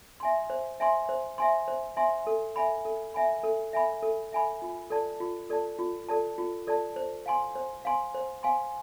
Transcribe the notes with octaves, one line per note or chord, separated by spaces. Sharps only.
E5 G#5 C6
C5
E5 G#5 C6
C5
E5 G#5 C6
C5
E5 G#5 C6
A4
E5 G#5 B5
A4
E5 G#5 B5
A4
E5 G#5 B5
A4
E5 G#5 B5
F4
A4 D5 A5
F4
A4 D5 A5
F4
A4 D5 A5
F4
A4 D5 A5
C5
F5 G#5 C6
C5
F5 G#5 C6
C5
F5 G#5 C6